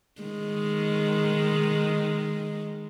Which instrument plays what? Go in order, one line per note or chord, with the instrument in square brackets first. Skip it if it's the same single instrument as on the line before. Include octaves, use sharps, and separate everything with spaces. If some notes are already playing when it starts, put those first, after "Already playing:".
[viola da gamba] D#3 G#3